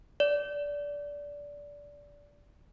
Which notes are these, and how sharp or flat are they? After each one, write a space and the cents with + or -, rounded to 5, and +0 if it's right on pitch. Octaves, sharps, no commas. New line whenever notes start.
D5 -20